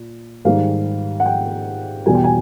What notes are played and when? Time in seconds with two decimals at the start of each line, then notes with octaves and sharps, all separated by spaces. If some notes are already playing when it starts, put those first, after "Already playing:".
Already playing: A#2
0.45 G#2 D#3 G3 F5
1.20 F#5
1.26 G5
2.06 E2 B2 G3 G#5
2.15 G5
2.24 G#5